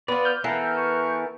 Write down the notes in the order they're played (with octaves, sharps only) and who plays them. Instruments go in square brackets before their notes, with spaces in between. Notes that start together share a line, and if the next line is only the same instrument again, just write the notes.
[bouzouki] B3 F4 [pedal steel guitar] D5
[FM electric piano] F6 G6
[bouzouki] E3 [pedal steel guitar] B3 A4 A#4 [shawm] F5
[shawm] E5
C#6